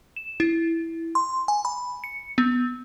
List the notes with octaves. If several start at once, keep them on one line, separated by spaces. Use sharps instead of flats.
E7
E4
C6
G#5
B5
C#7
B3